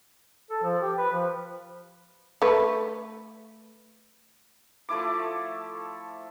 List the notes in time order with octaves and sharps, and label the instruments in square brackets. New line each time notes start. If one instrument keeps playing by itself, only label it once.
[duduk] A4
F3
G4
B4
F3
[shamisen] A3 B4
[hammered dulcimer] F3 A3 E4 D6